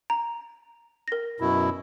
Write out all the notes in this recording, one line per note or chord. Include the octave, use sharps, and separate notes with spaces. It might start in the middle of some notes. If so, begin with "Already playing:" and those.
A#5
A#4 A#6
F#2 B2 E4